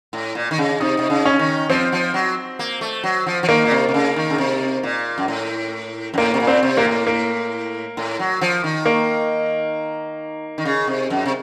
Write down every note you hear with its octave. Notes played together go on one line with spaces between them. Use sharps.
A2
A#2
D#3
C#3
C3 D#4
C3
C#3
C#4
D#3
F3 C4
F3
F#3
A#3
A3
F#3
F3
F3
D#3 A#3
A#2
C3
C3
C#3
D#3
C#3
C3
A#2
F#2
A2
F#2
A2 A#3
C3
A#2
C4
C3
A#2 A#3
A2
A#3
A2
F#3
F3
D#3
A#3
D#3
C#3
C3
F#2
C3